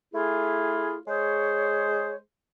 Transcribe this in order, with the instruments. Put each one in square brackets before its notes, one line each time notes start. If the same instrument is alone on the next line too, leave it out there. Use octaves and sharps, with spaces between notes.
[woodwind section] A3 E4 F4 G#4
G#3 G#4 C5 C#5